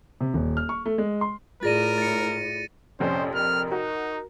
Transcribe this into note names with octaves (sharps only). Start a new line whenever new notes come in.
C3
D#1
F6
C#6
A3
G#3
C6
A2 F4 G#4 A#4 D5 A6 A#6 D#7
A6 C#7
A#1 F2 C3 C#4 C5
A#4 F6
D#4 F#4